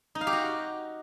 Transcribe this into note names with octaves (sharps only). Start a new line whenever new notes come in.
D#4
F5
G4
F#4